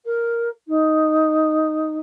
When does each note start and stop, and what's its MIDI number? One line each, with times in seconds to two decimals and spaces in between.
0.05 0.49 70
0.67 1.98 63